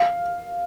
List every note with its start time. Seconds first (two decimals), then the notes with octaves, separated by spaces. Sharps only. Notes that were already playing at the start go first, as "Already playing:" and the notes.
Already playing: F5